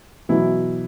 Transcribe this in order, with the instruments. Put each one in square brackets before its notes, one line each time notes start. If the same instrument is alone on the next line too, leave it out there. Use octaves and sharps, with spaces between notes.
[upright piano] B2 E3 F#3 E4